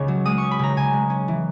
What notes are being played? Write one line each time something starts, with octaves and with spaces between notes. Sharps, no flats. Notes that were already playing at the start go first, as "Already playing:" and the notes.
Already playing: C#2 C#3 C#6
F#3
G#3 D#6
C#4 C#6
B5
C#3 A#5
C#3 G#5
G#3
C#4
E3